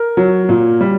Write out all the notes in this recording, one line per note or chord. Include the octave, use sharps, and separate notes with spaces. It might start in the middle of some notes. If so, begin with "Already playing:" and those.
Already playing: A#4
F#3
A#2
G3